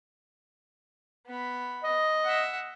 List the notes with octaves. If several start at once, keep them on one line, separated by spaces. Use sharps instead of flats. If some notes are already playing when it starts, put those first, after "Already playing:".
B3 B5
D#5
E5 F#5